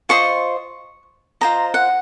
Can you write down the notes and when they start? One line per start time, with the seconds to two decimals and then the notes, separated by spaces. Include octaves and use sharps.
0.09 F4 C5 D#5 C#6
1.41 F4 C5 D#5 A#5
1.74 F#5